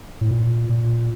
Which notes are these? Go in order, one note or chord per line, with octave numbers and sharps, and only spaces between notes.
A2
A#2
A#2